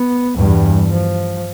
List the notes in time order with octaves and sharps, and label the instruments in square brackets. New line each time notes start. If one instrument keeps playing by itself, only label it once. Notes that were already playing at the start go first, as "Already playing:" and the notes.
Already playing: [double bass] B3
[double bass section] E2 G2 [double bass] G3
[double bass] F3